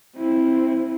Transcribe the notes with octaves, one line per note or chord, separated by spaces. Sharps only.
C4 E4